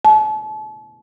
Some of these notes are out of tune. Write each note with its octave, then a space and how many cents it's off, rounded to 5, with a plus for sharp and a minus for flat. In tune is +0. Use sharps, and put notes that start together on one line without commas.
A5 -40